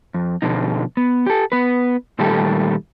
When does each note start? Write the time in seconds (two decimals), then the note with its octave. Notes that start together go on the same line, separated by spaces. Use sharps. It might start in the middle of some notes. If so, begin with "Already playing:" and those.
0.14 F2
0.42 B2 D3 F3 D#4
0.97 B3
1.26 G4 A4
1.52 B3 B4
2.19 A#2 D#3 G3 A3 G4 A4